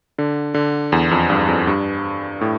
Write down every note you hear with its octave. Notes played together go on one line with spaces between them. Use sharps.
D3
D3
E2
F2
G2
F2
G2
A2